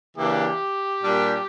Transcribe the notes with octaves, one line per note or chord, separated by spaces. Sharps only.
C#3 E3 A#3 D4 G4
A#2 G3 D4